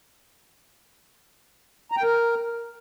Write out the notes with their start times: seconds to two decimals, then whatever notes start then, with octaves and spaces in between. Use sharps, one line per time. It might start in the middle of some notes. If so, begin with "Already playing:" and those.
1.92 A#5
1.97 G5
2.03 A#4